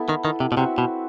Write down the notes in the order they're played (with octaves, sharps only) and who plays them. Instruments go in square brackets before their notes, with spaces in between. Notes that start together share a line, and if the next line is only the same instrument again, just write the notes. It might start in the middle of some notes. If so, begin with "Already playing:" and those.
Already playing: [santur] B3 E4 A4
[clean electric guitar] D#3
D#3
C3
B2
[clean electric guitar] C3 [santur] C4 F#4 B4 E5
[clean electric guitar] B2